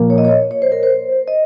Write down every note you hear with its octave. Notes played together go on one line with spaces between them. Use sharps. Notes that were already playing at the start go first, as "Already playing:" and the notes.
Already playing: A#2 F3 A#3
C#5
D#5
C#5
C#5
C5
A#4
C5
D#5